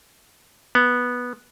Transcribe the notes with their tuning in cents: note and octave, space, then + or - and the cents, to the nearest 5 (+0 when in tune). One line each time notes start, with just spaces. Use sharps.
B3 -10